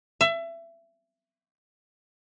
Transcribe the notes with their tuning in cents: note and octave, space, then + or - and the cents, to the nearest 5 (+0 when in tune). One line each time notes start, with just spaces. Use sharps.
E5 +25